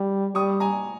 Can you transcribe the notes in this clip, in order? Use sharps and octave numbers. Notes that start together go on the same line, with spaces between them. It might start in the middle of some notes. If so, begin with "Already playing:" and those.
Already playing: G3
G3 C#6 D#6
G#5 A#5